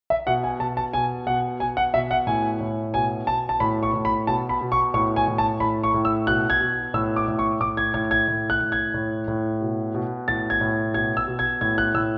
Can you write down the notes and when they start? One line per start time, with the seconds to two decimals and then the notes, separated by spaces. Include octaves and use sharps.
0.10 E5
0.27 B2 F#5
0.44 G#5
0.60 B2 A5
0.77 A5
0.93 B2 G#5
1.27 B2 F#5
1.60 B2 G#5
1.77 F#5
1.94 B2 E5
2.11 F#5
2.27 A2 G#5
2.60 A2
2.94 B2 G#5
3.27 B2 A5
3.49 A5
3.60 A2 B5
3.83 C#6
3.94 A2
4.05 B5
4.27 B2 A5
4.49 B5
4.61 B2
4.72 C#6
4.94 A2 C#6
5.16 G#5
5.28 A2
5.38 A5
5.60 A2 B5
5.83 C#6
5.94 A2
6.05 E6
6.27 B2 F#6
6.50 G#6
6.61 B2
6.94 A2 E6
7.16 D6
7.28 A2
7.39 C#6
7.61 A2 D6
7.77 G#6
7.94 A2 G#6
8.11 G#6
8.28 A2
8.50 F#6
8.61 A2
8.72 G#6
8.94 A2
9.28 A2
9.61 B2
9.94 B2
10.28 A2 A6
10.50 G#6
10.61 A2
10.94 B2 G#6
11.17 E6
11.28 B2
11.39 G#6
11.61 A2 G#6
11.78 F#6
11.94 A2 E6